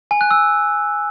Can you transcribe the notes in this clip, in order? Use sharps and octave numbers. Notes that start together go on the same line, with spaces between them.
G#5
F#6
E6